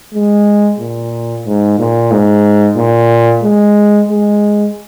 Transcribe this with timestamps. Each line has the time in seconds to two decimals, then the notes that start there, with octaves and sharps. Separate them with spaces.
0.14 G#3
0.79 A#2
1.46 G#2
1.79 A#2
2.12 G#2
2.77 A#2
3.43 G#3
4.09 G#3